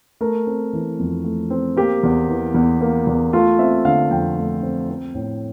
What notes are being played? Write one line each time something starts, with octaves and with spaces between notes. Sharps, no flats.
A3 A#4
C4
E3
F2
A3
C4
A#3 G4
E2
E3
E2
A#3
E2
A3 F4
C4 E5
D3 F5
F2 G5
A3
C4
C4
A2